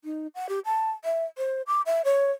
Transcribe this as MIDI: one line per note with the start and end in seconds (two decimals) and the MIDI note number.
0.04 0.27 63
0.35 0.49 78
0.49 0.59 67
0.65 0.90 81
1.05 1.25 76
1.38 1.62 72
1.67 1.81 86
1.86 2.02 76
2.05 2.31 73